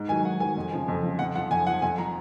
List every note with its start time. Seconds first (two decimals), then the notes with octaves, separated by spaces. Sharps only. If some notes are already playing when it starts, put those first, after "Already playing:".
Already playing: G#2
0.09 D#3 G#5
0.12 F#3
0.25 G#2 F#5
0.40 D#3 F#3 G#5
0.57 F2
0.73 C#3 F3
0.88 F2
1.03 C#3 F3
1.19 F2 F#5
1.35 F3 F#5
1.51 F2 G#5
1.67 F3 F#5
1.82 F2 G#5
1.98 F3 A#5